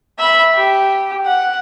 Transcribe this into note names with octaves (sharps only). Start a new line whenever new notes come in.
E5 B5
G4
F#5